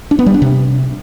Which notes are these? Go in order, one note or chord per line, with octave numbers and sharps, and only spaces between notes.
D4
B3
G3
D4
C3